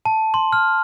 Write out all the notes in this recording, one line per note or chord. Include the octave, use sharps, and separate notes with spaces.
A5
C6
F6